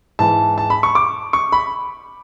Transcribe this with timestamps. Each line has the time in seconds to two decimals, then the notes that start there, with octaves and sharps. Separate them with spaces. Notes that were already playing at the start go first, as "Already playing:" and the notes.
0.19 G#2 E3 A5
0.58 A5
0.70 B5
0.83 C#6
0.95 D6
1.33 C#6
1.52 B5